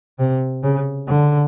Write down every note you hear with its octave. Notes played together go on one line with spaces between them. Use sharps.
C3
C#3
D3